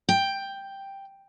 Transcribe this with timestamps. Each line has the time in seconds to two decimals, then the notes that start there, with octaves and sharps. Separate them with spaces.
0.09 G5